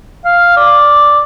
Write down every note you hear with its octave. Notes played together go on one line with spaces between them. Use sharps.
F5
D5